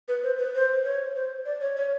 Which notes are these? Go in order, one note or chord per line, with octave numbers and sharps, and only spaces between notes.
B4
C5
B4
C5
C#5
C5
D5
C#5
C#5